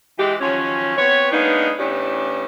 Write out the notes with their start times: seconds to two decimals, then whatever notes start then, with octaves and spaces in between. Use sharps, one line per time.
0.19 E3 G#3 G4
0.40 D#3 F3 F#3 C#4
0.97 B3 C4 B4 C#5
1.32 G#3 A#3 B3 D4 D#4
1.79 A2 E3 B3 C#4 D4 G4